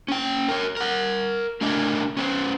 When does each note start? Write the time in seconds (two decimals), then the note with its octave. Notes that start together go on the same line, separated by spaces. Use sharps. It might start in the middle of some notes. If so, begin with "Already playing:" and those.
0.08 C#4 G5
0.48 A#4 C#5
0.77 A#4 F#5
1.61 A3 D4 A#4 D#5 E5 G#5
2.17 C#4 B4 C5